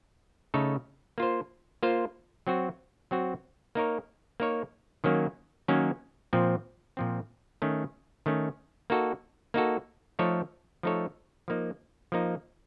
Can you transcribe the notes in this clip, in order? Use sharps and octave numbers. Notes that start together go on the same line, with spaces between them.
C#3 A3 D#4 A4 C#5
A#3 F4 C5
A#3 F4 C5
F#3 C4 F#4
F#3 C4 F#4
A#3 D#4 A#4 C#5
A#3 D#4 A#4 C#5
D#3 F#3 A#3 C#4
D#3 F#3 A#3 C#4
A#2 F3 C4
A#2 F3 C4
D#3 A3 C#4
D#3 A3 C#4
A#3 D#4 F#4 A4
A#3 D#4 F#4 A4
F3 A3 D#4 A4 C#5
F3 A3 D#4 A4 C#5
F3 A#3 D#4
F3 A#3 D#4